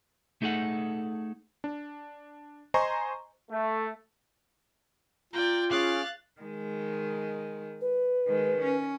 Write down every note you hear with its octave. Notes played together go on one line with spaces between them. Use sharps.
A3 D#4 G#4 A4 F#5
D4
C5 D#5 G#5 A#5 C6 C#6
A3
F4 D5 G5 A#5
C#4 G#4 F5 D6 F#6 A6
D#3 G#3
B4
D#3 G#3
C#4